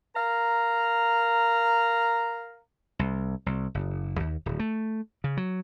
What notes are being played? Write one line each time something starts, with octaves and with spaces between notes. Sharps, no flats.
A#4 F5 A#5
C2
C2
F#1
D#2
D1
A3
C#3
F#3